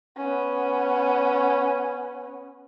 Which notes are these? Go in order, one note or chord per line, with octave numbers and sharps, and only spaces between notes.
B3 C#4